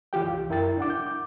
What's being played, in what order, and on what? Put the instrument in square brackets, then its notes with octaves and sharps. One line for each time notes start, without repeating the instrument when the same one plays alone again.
[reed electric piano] E3 F4 G4 G5
C2
F#2 E4 A#4 G5 A6
D4 E4 F#5 D6
G6
D6